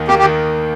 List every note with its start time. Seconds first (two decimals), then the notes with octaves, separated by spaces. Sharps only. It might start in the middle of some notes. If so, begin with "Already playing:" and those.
Already playing: D#2 D#3
0.08 A#3 G4
0.19 G4
0.23 D#3